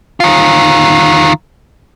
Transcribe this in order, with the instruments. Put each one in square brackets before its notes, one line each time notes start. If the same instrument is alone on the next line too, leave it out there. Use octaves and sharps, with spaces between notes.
[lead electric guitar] D#3 F4